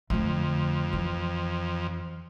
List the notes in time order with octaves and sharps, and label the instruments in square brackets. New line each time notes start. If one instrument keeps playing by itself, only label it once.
[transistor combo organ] F2 [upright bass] D3 A3
[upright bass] E3